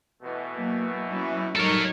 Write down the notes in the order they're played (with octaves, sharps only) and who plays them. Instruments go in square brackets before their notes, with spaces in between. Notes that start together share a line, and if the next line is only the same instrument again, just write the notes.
[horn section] B2 E3 A3
[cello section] F#3 A#3
F#3 C#4 E4
[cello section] F#3 G3 D#4 [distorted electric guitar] A4 C#5 [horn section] A#4